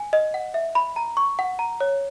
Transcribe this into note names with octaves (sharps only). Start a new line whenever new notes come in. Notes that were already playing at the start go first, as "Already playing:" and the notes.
Already playing: G#5
D#5
F#5
E5
B5
A#5
C#6
F#5
A#5
C#5